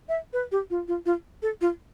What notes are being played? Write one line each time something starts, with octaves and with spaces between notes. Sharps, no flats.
E5
B4
G4
F4
F4
F4
A4
F4